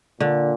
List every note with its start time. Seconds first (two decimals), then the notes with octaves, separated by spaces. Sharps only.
0.20 A#2 D3